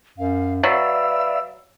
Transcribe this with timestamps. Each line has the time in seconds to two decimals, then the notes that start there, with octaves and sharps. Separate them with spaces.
0.18 F#2 F5
0.63 F#3 B4 D5 E5 F5 E6